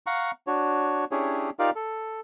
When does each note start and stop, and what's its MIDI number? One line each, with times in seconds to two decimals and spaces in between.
0.06 0.31 77
0.06 0.31 78
0.06 0.31 82
0.06 0.31 85
0.47 1.05 62
0.47 1.05 66
0.47 1.05 73
1.11 1.50 61
1.11 1.50 62
1.11 1.50 64
1.11 1.50 67
1.11 1.50 68
1.11 1.50 73
1.59 1.70 63
1.59 1.70 65
1.59 1.70 67
1.59 1.70 70
1.59 1.70 74
1.59 1.70 77
1.75 2.20 69